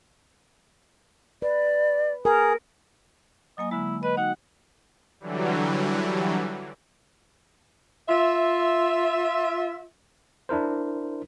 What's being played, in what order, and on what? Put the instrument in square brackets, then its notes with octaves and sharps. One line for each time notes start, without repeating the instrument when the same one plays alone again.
[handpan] B4 [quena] D5
[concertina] G#4 [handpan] A#4
[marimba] F#3 A#3 G#5 [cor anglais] D#5
[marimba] D3 G#3 [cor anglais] E4
[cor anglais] B4 [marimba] D#5
[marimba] D#4 F#4 G5 [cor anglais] F#5
[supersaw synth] D3 E3 F#3 G3
[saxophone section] F4 E5
[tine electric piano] D4 E4 A#4 C5